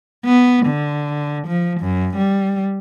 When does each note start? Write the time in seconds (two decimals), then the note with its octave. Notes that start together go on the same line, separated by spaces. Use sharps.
0.25 B3
0.66 D3
1.47 F3
1.80 F#2
2.16 G3